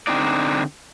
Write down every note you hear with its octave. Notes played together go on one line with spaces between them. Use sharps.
D3 C4 D#4 D5